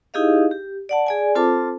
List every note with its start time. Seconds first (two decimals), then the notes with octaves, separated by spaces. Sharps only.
0.14 D#4 E4 G4 G#4 D#5 F5
0.51 G4
0.89 D5 F#5 A5
1.07 G#4 D5 G#5
1.35 C4 F4 A4 C5 A5 D6